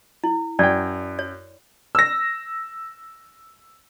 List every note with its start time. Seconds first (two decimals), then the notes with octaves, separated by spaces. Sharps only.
0.24 E4
0.59 F#2 D5 G5
1.19 C#5
1.95 E6 A#6